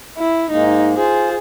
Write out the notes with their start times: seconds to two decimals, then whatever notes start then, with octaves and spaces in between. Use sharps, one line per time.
0.17 E4
0.51 G#2 G#3 A#3 D#4
0.96 F4 G#4 C5